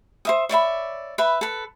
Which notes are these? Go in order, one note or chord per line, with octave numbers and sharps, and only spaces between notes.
C5 E5 D#6
C#5 D5 E5 B5
B4 E5 B5
A4 B4